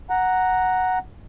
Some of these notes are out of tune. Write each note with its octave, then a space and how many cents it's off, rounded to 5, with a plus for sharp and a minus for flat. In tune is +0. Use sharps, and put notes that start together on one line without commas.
F#5 +0 A#5 +0